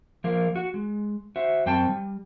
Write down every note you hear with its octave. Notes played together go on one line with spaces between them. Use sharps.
F3 A#3 F4 A#4 F5
F#4
G#3
F#4 C5 E5
F#2 C4 G5 A5
G3